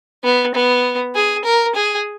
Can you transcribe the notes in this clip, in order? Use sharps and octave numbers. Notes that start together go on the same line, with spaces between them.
B3
B3
G#4
A#4
G#4